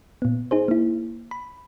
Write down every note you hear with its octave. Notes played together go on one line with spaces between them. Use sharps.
A#2 B3
D#4 G#4 C5
A#3 E4
B5